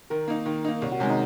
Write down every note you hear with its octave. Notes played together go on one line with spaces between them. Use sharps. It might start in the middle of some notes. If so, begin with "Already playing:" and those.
D#3 A#4
A#3 D#4
D#3
A#3 D#4
C2 C#5
F#4
C3 D#3 G#3 C#4
D#4